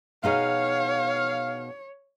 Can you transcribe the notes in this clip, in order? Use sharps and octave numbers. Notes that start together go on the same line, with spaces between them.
B2 D#4 G#4 C#5 F5